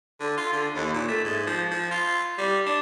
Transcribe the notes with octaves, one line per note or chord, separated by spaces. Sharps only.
D3
F4
D3
D#2
A#2
A3
G#2
F3
F3
F4
G3
D4